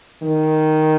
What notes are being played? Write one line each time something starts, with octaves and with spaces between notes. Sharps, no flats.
D#3